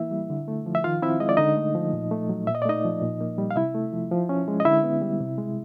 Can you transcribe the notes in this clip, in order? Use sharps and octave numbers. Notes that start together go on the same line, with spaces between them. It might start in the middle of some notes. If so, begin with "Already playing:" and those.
Already playing: E3 A#3 E4 E5
G3
D3
A3
F3
E5
D#3 F4 F5
C4 E4 E5
G#3 D#5
D5
D3 D#4 D#5
A3
F3
A#2
A3
F#3
A#2 E5
D#5
D5
A3 D#4 D#5
F3
A#2
A#3
G3
F5
C3 E4 E5
A3
F3
F3
C#4
G#3
D#5
D3 E4 E5
B3
G3
C3
G#3